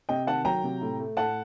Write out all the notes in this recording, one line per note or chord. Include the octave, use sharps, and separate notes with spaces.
C3 D#5 G5
D#3 F#5 A5
F#3 G5 A#5
C3
A2
A3
A2 F#5 A5